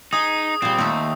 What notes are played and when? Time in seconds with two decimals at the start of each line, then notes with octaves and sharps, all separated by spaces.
0.13 D#4 G#4 D#6
0.62 A#2 G3 C4
0.78 D#2 A3 C4